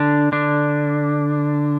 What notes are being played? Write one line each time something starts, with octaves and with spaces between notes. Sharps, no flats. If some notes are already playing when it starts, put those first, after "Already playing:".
Already playing: D3 D4
D3 D4